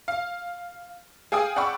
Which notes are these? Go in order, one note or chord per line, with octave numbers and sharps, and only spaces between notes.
F5
G#4 F5 G5 G#5 D#6
D5 F#5 G5 B5 C#6 E6